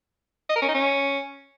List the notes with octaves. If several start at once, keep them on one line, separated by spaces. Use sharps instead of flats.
D#5
A#4
C#4
D#4
C#4